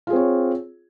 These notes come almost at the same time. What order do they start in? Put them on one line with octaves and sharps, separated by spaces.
F4 G#4 C4 C#5